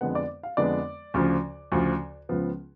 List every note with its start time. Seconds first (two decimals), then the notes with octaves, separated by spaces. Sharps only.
0.01 F2 D3 G#3 B3 F#5
0.15 D5
0.43 F5
0.57 F2 D3 G#3 B3 D5
1.14 D2 C#3 F3
1.72 D2 C#3 F3
2.29 C#2 C#3 F3 B3